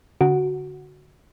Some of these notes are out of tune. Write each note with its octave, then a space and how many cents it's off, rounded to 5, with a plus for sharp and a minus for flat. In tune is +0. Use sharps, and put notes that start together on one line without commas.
D3 -30 F#4 +0